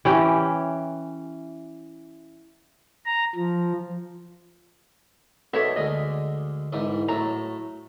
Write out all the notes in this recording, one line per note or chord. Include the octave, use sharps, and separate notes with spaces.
E3 C#4 G4
A#5
F3
B1 B3 D4 A4 C#5 E5
D2 D3 G#3 D#5
C2 G#2 E3
A2 F#3 A3 A#5